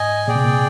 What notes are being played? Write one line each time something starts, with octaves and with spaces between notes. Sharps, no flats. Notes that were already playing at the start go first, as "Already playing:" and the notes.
Already playing: G#2 D#5 G#5
A#2 G#4 D5 G5
C3
A#2